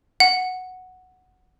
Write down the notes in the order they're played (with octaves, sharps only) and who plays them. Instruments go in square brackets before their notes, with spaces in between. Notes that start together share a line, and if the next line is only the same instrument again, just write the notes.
[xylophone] F#5